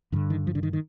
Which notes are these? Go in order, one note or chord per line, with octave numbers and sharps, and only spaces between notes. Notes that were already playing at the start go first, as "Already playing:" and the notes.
G2 D3 D#3
D#3
F3
D3
D#3
D#3